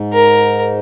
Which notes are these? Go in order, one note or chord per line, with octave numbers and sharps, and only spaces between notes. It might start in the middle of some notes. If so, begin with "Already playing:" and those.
Already playing: G#2
A#4